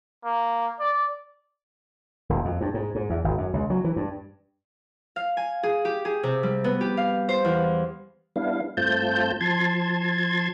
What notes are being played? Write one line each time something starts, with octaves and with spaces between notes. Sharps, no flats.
A#3
D5
D#1
F2
G2
G#2
G#2
E2
G#1
F#2
C#2
F#3
E3
G2
F5
G#5
G#4
G4
G#4
C3
G3
B3
G4
F5
C5
E2
G3 B3 D4 E4 F5
G2 A3 C4 F4 A5 G6
F3 A5 C6 G#6